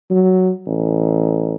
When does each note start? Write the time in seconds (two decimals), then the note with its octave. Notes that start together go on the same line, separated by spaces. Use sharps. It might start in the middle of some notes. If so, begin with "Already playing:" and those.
0.11 F#3
0.67 A1